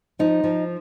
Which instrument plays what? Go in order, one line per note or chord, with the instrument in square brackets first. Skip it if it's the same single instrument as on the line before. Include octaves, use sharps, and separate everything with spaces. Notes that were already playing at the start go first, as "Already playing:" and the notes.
[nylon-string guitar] F3 D#4
F3